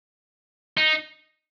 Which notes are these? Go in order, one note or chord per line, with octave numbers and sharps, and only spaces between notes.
D#4